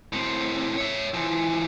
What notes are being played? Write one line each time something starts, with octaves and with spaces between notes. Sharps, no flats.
A2 C4
C#5 E5
E3 F3